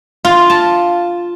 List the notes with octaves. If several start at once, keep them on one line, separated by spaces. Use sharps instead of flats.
F4
A5